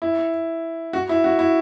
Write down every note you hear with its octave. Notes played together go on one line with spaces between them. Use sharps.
E4
F#4
E4
F#4
E4